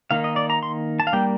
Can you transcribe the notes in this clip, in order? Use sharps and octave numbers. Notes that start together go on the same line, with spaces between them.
D#3 A#3 D#4 F5
D#5
D5
A#5
C6
A5
F5
G3 A#3 D4 G5